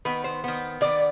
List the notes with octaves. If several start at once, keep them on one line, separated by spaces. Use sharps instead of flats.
D#3 B3 B4
C5
D#3 B3
D#3 B3 D5